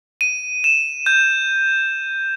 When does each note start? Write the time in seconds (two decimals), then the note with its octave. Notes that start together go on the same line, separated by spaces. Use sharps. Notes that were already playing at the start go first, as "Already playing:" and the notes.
0.21 D#7
0.64 E7
1.06 G6